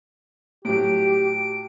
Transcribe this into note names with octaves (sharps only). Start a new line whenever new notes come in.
A2 F#3 G4 D7